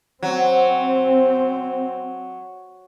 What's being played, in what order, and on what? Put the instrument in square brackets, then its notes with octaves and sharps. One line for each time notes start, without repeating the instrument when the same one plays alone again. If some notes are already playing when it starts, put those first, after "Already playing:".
[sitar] F#3 [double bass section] C4